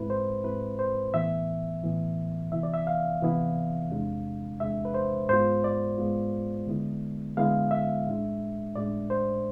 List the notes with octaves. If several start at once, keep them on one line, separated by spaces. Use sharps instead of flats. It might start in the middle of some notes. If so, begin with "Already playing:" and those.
Already playing: G#2 G#3 C4 E4 B4
C5
G#2 G#3 C4 E4 B4
C5
A2 E3 B3 E5
A2 E3 B3
C3 E3 B3 E4 E5
D5
E5
F5
C3 E3 B3 E4
E2 C3 G#3 D4
E2 C3 G#3 D4 E5
B4
C5
G#2 G#3 B3 F4 C5
D5
G#2 G#3 B3 F4
D3 G#3 B3 E4
D3 G#3 B3 E4 F5
E5
A2 G#3 D4
A2 G#3 D4 D5
C5